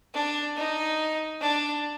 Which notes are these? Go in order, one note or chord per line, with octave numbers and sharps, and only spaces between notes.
D4
D#4
D4